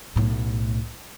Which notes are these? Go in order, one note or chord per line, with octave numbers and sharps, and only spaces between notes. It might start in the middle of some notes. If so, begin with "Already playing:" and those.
B1 A2